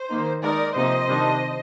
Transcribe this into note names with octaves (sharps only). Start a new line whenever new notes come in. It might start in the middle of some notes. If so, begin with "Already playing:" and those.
Already playing: C5
D#3 A#3 D#4
D#3 G#3 D#4 A#4 D5
C3 F3 A#3 D#4 C5 D#5
C3 D#3 G3 D4